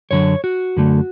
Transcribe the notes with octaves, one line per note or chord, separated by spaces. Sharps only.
F#2 D3 F#3 C#5
F#4
F#2 D3 A3